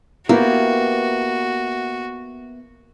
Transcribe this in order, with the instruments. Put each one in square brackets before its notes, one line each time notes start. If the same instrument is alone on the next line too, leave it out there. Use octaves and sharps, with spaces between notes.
[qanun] A#3 [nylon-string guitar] B3 E4 G4 [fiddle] F#4